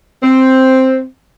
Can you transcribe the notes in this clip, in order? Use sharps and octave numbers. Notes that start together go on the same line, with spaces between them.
C4